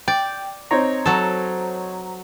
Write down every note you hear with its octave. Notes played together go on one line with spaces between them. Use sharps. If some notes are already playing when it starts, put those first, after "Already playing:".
D5 G5
C4 D#4 C5 C#5 A#5
F#3 A4